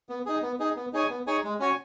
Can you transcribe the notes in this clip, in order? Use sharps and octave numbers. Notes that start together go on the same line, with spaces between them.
B3
D#4 G#4
B3
D#4 G#4
B3
D#4 G#4 C#5 G#5
B3
D#4 G#4 C#5 G#5
G#3
C#4 F#4 C#5 G#5